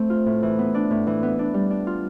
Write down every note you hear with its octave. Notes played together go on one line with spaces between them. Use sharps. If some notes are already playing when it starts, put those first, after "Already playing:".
Already playing: A3 C4
F4
A2
E3
B3
D4
A2
E3
B3
D4
G3
D4
F4